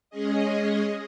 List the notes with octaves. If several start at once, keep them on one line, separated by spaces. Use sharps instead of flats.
G#3 C#4 G#4 D#5